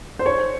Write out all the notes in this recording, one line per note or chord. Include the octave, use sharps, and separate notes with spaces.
C5
C#5